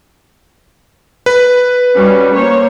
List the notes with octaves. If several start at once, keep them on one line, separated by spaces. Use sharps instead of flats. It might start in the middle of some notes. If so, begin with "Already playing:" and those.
B4
G3 C#4 F#4
A#3 C5 C#5